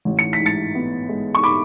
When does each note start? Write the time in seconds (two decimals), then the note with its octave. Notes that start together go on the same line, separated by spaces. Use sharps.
0.05 A1
0.19 C#7
0.33 B6
0.39 G#2
0.46 A6 C#7
0.75 B3
1.09 G#3
1.35 C#6
1.43 B5 D6